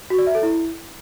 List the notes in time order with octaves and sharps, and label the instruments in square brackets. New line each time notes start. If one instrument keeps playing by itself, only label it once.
[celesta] F#4
D5
E5
A4
E4